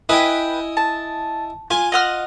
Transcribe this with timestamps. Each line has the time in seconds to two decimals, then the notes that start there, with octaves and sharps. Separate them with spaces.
0.09 E4 B4 D#5 G5 G#5
0.77 A5
1.71 F4 G#5
1.92 D#5 F#5 F6